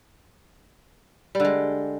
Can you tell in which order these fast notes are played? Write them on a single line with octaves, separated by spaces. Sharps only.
G3 D3 G#3